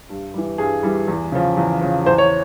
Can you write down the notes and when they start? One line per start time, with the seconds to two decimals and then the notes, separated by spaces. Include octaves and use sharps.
0.09 G2
0.34 E3 G3
0.58 G2 G#4
0.83 E3 G3
1.08 E2
1.32 C#3 F3
1.57 E2
1.81 C#3 F3
2.06 E2 C5
2.18 C#5